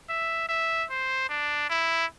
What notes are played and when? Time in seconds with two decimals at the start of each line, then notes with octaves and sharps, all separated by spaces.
0.09 E5
0.49 E5
0.90 C5
1.30 D4
1.70 E4